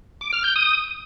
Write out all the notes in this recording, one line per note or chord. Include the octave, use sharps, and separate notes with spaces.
D6
F6
G6
D#6